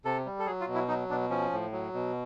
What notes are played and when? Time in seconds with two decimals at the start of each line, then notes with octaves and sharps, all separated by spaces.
0.05 C3 A4
0.26 G3
0.39 A4
0.46 F#3 G#4
0.61 F4
0.68 B2
0.74 E4
0.88 F#3 D#4
1.10 B2 D4
1.30 F3 C#4
1.52 A2
1.72 F#3
1.94 B2